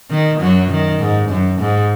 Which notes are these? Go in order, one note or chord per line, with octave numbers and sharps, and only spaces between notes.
D#3
F#2 F#3
D#3
G#2
F#2
G#2